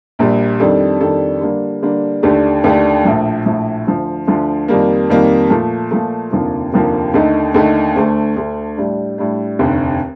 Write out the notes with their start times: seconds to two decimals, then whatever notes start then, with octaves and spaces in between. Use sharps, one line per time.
0.19 A#1 A#2 G3
0.60 F2 D#3 G3 D4 A4
1.01 F2 D#3 G3 D4 A4
1.41 D3 G3 A#3 D4
1.82 D3 G3 A#3 D4
2.23 D#2 D3 A3 D4 G4
2.64 D#2 D3 A3 D4 G4
3.05 A#1 A2 F3
3.46 A#1 A2 F3
3.87 D2 D3 F3
4.27 D2 D3 F3
4.68 F2 D#3 G3 A#3
5.09 F2 D#3 G3 A#3
5.50 A#2 F3 A3
5.91 A#2 F3 A3
6.31 F1 D#2 D3 F3 A#3
6.72 F1 D#2 D3 F3 A#3
7.14 D#2 D3 A3 D#4
7.54 D#2 D3 A3 D#4
7.96 D2 D3 A3
8.36 D2 D3 A3
8.77 A2 G3 D4
9.18 A2 G3 D4
9.59 F1 D#2 D3